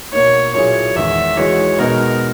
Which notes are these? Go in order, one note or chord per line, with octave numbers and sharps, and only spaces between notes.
B2 A#3 D#4 C#5
A#2 F#3 C#4 E4 G#4 C#5
E2 D#3 G#3 E5
E3 G#3 D#4 F#4 C#5
B2 G#3 B3 D#4 A#4